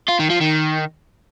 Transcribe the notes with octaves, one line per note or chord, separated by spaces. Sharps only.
F4
D#3
F3
D#3